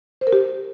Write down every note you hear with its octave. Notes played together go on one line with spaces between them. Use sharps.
C5
A#4
G4